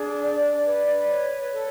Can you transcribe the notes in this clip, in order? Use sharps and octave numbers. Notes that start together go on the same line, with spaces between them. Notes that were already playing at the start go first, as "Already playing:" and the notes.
Already playing: D4 G#4
D5
B4
C#5
A4